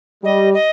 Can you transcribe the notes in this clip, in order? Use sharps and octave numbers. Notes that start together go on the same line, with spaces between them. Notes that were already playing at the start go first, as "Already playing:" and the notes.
G3 D#5
D#5